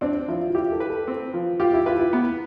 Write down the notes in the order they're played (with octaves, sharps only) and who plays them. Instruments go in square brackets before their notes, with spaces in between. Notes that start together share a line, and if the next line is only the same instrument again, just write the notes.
[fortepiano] C4 [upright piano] D4
[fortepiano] F3 [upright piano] E4
[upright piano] F4
[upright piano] E4 [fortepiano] G4
[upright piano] A4
[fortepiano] B4
[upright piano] A4
[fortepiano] C4
F3
[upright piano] F4 [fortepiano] G4
[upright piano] E4
[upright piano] F4 [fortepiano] B4
[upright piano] E4
[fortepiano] B3